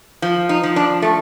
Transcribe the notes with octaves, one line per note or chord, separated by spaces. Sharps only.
F3
D#4
F3
D4
A3